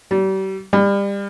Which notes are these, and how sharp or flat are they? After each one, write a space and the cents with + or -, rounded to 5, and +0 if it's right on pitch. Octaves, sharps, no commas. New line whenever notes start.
G3 -40
G3 +30